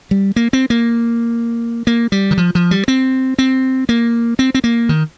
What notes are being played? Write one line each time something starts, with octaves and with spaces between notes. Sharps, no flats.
G3
A#3
C4
A#3
A#3
G3
D#3
F3
F3
G3
C4
C4
A#3
C4
C4
A#3
D#3